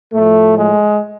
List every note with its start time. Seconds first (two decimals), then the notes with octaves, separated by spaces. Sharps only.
0.13 A2 F3 A3
0.55 G#3